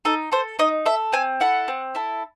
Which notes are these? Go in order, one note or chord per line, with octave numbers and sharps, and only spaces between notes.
D#4 A4
A4 C5
D#4 D#5
A4 E5
C4 G#5
E4 A4 F#5
C4
E4 A4